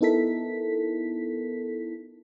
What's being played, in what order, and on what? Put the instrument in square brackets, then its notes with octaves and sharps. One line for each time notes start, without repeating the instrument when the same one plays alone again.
[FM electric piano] B3 D#4 E4 A4 A#4 B6